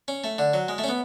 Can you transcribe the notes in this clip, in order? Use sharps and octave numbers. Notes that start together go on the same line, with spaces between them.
C#4
A3
D3
F#3
G#3
A3
C#4
B3